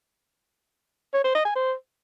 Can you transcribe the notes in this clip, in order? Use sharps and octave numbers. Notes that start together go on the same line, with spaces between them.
C#5
C5
D#5
G#5
C5